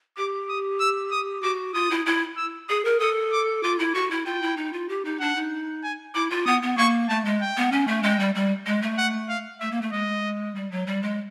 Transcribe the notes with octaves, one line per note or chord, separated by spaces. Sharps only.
G4 D6
D#6
E6
D#6
F#4 D6
F4 D#6
E4
E4
E6
G#4 D#6
A#4
A4 D#6
D6
F4 D6
E4
F#4 C#6
E4
F4 G5
E4
D#4
F4
G4
D#4
D4 F#5
D#4
G#5
E4 D6
F4
B3 D#6
B3
A#3 C#6
A3 A5
G#3
G5
B3
C#4
A3
G#3 G5
G3
G3
G#3
A3
F#5
F5
A3 E5
A#3
A3
G#3 D#5
G3
F#3
G3
G#3